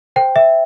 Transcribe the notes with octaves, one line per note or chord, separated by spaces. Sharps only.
C5 G5
E5